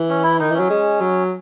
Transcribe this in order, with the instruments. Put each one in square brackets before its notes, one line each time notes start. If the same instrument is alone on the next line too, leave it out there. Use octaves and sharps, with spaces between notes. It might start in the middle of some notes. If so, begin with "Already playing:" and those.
Already playing: [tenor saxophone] E3
[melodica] C#4
E4
[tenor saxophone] D#3 [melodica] D#4
[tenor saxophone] E3 [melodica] C#4
[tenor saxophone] F#3
G#3
F#3